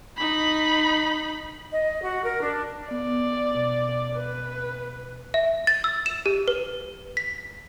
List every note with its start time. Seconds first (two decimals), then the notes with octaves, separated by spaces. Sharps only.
0.17 D#4 B5
1.73 D#5
2.02 F#4
2.24 A#4
2.42 D4
2.91 B3 D5
3.55 B2
4.17 B4
5.34 E5
5.67 A6
5.84 E6
6.06 E7
6.26 G4
6.48 B4
7.17 B6